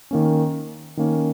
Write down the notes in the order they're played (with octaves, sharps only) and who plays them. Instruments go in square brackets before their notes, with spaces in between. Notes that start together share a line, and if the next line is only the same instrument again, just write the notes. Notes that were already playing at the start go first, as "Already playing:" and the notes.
[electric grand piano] D#3 A#3 C#4
D#3 A#3 C#4